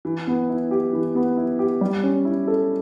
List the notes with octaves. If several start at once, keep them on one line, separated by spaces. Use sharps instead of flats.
E3
B3
E4
G4
E3
B3
E4
G4
G3
C#4
E4
A4